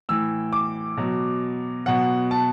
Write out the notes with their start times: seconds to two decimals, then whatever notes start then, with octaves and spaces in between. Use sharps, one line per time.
0.09 A2 E3 E6
0.53 D6
0.97 B2 F#3
1.86 B2 F#3 F#5
2.31 A5